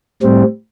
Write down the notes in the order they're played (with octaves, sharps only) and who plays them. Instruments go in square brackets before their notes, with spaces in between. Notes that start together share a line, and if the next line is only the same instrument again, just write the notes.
[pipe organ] A2 G3 C4